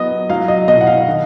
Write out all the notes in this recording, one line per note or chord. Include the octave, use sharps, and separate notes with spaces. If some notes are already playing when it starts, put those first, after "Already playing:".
Already playing: F#3 B3 D#5
F#3 F5
D#5
B2 D#5
F#5
F5
D#3